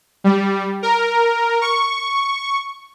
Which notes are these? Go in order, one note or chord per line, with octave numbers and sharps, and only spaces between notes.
G3
A#4
C#6